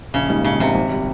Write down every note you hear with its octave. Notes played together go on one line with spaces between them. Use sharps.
A#1 C#3
G#2 G3 A#3 D#4
A#1 C#3
G#2 C3 G3 A#3 D#4
G#1
G3